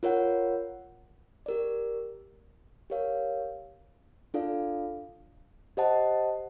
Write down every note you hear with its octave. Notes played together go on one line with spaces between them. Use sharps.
F4 A#4 C#5 F#5
G4 A#4 D5
G4 A#4 C#5 F5
D4 F4 A4 D5 F5
G4 C5 D#5 F#5 A5